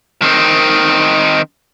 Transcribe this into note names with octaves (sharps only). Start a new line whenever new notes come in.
D#3 C4